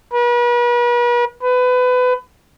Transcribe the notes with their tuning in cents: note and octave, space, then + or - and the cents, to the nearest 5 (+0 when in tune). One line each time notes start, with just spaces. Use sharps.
B4 -40
B4 +25